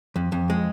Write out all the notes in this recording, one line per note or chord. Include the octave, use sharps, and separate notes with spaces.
F2
F2
G#3